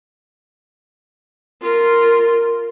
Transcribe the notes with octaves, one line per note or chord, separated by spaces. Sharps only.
F4 A#4